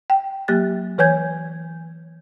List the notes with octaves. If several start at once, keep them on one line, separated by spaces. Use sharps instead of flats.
G5
F#3 A#3 G4 F#6 A6
E3 B4 C#5 G#5 G6 G#6